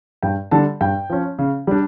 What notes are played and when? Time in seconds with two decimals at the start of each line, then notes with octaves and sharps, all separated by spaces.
0.23 G2 G5
0.51 D3 G3 A5
0.81 G2 G5
1.10 F3 C#4
1.39 C#3
1.67 G3 D4